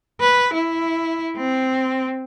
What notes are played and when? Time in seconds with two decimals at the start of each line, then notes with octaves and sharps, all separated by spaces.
0.21 B4
0.53 E4
1.36 C4